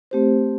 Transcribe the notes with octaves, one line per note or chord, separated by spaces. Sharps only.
A3 C4 G4 C5